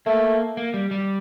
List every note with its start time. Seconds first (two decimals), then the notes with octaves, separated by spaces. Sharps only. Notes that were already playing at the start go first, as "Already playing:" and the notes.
0.06 A3 A#3
0.57 A#3
0.74 G3
0.91 G3